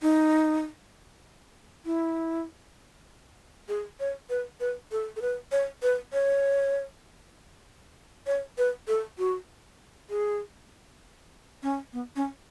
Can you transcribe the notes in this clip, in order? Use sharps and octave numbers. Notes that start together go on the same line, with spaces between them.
D#4
E4
G#4
C#5
B4
B4
A4
A4
B4
C#5
B4
C#5
C#5
B4
A4
F#4
G#4
C#4
B3
C#4